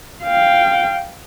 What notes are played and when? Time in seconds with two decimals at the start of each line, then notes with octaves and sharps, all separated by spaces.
0.24 F5 G5